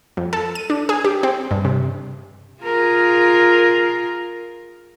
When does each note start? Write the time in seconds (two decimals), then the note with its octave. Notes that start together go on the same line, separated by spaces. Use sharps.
0.17 F2
0.33 A4
0.55 D#7
0.70 D4
0.89 G#4
1.04 G4
1.23 C4
1.51 G2
1.65 C3
2.63 F4 G#4 A#4